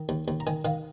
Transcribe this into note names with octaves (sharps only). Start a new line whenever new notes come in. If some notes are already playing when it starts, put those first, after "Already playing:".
Already playing: D#3
D#2
D#2
A#5
D#3 G#5
D#3 F5